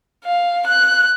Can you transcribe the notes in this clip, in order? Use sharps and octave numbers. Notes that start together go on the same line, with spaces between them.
F5
F#6